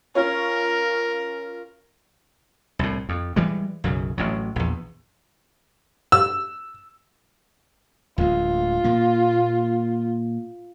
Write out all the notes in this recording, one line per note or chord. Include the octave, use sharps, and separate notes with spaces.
C#4 F4 A#4 C#5
C2 A2
F2
E3 G3 G#3
B1 F#2 C#3
A1 A2 F#3
A#1 E2
E6
D1 D2 G#3 F4
A#2 A#3